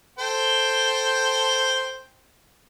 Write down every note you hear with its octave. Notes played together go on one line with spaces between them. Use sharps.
A4 C5 G5